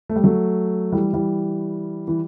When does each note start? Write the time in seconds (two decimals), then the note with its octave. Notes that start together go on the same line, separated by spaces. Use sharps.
0.10 A3
0.16 G3
0.24 F#3 A3
0.92 E3 G3
1.13 E3 G3
2.08 E3